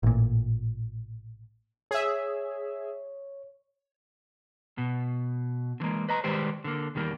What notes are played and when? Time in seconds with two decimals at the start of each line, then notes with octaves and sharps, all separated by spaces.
0.03 A1 A#2
1.91 G#4 C#5 E5
4.78 B2
5.80 D3 E3 G#3 A#3
6.09 B4 D#5 A#5
6.24 D#3 G3 G#3 G4 B4 C5
6.64 D3 A#3
6.95 E2 D#3 G3 A#3